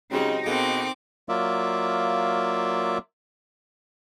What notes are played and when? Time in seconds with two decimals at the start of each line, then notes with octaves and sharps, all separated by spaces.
0.12 C#3 F#3 G#3 C4 D#4 G4
0.46 B2 A#3 C4 G#4 A4 D6
1.29 F#3 A#3 F4 D5 E5